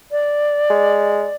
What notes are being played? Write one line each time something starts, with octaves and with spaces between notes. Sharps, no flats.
D5
G#3